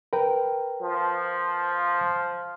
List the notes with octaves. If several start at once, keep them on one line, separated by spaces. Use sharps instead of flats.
A#4 B4 G5
F3